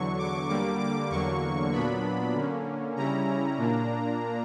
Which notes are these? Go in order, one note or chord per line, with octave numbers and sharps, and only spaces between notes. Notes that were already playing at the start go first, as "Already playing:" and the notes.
Already playing: E2 D3 F#3 C#6
D6
D3 G3 A#3 D6
D6
E2 D3 F#3 A#3 C#6
A#2 F#3 B3 D4 B5
D3 A#3 C#4
C#3 G3 C#4 E4 A#5
A#2 A#3 D4